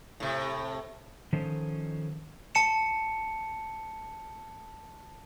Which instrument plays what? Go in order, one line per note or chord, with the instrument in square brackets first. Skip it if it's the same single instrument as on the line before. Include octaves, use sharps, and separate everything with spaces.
[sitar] A2 C3
[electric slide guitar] D#3 F3 C#4 A4 C5
[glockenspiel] A5 C#7 E7